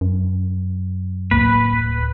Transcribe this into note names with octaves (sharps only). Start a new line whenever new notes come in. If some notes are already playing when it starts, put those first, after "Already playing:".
F#2
D1 F2 A#3 B4